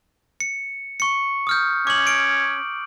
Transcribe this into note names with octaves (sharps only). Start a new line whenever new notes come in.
C#7
C#6 C#7
D#6 F6 G6
C#4 D6 F#7
D7